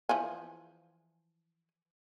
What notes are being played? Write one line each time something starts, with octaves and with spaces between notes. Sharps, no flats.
E3 F3 G#5